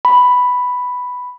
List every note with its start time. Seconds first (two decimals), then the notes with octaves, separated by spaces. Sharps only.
0.05 B5